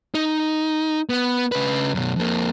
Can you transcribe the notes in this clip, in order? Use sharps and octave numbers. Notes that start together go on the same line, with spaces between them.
D#4
B3
C#3 B4
F#2 B2
F2 A#3